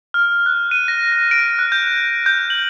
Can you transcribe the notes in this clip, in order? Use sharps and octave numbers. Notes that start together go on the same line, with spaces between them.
F6
F#6
D#7
A#6
A#6
D7
F#6
G6
G6
F#7